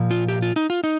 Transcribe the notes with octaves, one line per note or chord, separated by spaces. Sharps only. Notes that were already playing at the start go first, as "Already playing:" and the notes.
Already playing: A#2 F3
F4
G4
F4
D#4
F4
D#4